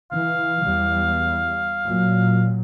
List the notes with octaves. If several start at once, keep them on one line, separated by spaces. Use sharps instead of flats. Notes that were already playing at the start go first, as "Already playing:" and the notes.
E3 F5
E2 G3
A#2 F#3